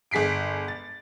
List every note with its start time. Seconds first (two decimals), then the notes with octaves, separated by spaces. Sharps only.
0.11 G1 G#4 B6 C7 D7
0.68 A6